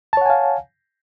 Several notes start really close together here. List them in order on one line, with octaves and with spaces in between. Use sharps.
A5 C#5 F#5 G#5 F5